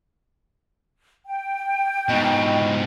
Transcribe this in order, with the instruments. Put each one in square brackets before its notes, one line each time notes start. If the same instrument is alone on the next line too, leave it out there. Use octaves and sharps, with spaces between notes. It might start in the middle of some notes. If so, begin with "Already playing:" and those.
[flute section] G5
[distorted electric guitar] G#2 B2 [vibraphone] D#5 B5 C#6